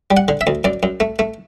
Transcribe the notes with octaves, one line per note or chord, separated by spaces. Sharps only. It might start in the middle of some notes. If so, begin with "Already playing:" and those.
G3
F#5
D3
E5
D2
F#2 D5
F#2
A3
A3